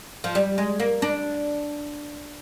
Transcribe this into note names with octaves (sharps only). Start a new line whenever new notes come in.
F3
G3
G#3
A#3
D4